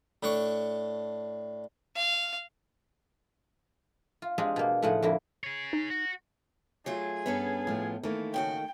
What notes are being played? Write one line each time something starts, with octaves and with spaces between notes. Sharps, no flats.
A2 D4 C#6
F5
F4
G#3 C4 D4 F4 G4 G#4
B2 A#3
A2 C#3 F3 D#4 F#5 G#5
F2 D3 A#3 E4 A#4
G#4 C#5
D#4
F#4
F#3 A3 F4 G#4
G2 B3 C#4 A4
A2 F3
D#3 E3 A3 A#3
A2 C#3 F#4 G5